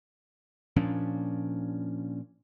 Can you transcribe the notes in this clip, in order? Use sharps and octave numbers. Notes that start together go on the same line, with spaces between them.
A#2 F3 C#4 D4